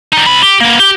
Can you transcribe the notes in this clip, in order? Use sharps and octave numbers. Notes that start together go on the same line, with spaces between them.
G3 D#4
C3 B5
G4
A#3 B3
G4